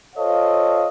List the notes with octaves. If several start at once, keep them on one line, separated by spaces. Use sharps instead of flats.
F4 A4 C5 C#5 D#5 F5